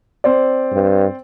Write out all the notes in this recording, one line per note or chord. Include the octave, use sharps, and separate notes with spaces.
C4 C5 D5
G2